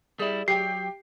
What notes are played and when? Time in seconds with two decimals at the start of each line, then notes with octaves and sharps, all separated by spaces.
0.19 G3 E4 G#4 D5 E5
0.48 F#3 G4 G5 C7